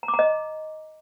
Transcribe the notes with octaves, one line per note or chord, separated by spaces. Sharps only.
A#5
D6
A#5
D#5